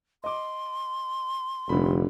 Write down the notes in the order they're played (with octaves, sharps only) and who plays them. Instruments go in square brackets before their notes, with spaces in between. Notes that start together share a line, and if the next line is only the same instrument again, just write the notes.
[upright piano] D#5 D6 [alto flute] C6
[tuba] F1 [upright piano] D3 G3 B5